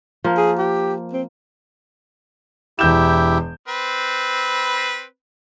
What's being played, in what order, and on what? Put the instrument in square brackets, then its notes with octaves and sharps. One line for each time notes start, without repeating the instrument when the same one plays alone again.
[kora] F3 A#3
[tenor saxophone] G#4
G4
C4
[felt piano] E1 G6 E7 [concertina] E4 G4
[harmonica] C4 B4